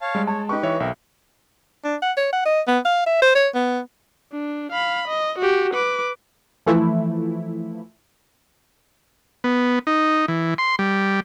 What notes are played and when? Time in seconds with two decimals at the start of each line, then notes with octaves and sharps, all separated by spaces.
0.01 C#5 F5 A5
0.15 G3 G#3
0.27 C#5 A5
0.49 D#4 G4 B4 C#6
0.63 E3 C#5 E5
0.80 B1 C4 A#4 E5
1.84 D4
2.02 F#5
2.17 C#5
2.33 F#5
2.45 D#5
2.67 B3
2.85 F5
3.06 E5
3.22 C5
3.35 C#5
3.54 B3
4.33 D4
4.72 F5 B5
5.08 D#5
5.39 F#4 G4
5.74 B4 D6
6.66 E3 F3 A3 E4
9.44 B3
9.87 D#4
10.28 E3
10.58 C6
10.79 G3